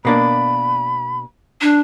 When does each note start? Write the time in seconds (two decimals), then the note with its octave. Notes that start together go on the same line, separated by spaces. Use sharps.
0.05 B2 A#3 D4 B5
1.61 D4